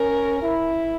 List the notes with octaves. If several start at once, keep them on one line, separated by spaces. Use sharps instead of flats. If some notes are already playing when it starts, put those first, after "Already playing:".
Already playing: C#4 A#4
E4